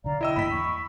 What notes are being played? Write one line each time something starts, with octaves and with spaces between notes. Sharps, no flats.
B1 D3 D5 F5 A#5
E4 D#5 G5 E6
A1 G2 A#3 B5 B6
E2 E3 C#6